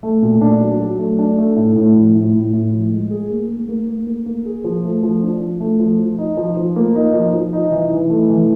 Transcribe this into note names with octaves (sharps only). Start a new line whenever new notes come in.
A3
A#2
D4
F#3
F#3
A3
D4
A3
A2
A2
F3
A2
A2
A2
F3
G#3
G#4
A#3
A#3
A#3
A#3
A#3
A#3
G#4
F3
A3
F3
D4
F3
A3
F3
F3
D#4
F3
F3
A#3
D#4
F3
F3
D#4
E3
E3
A3
E3